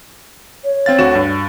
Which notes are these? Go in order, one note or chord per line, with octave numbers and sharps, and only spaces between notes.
C#5
C4 F5 A6
D2 F#4 E7
G2